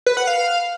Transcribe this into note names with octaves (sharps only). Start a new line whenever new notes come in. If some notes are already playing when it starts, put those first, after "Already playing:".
B4
F#5
F5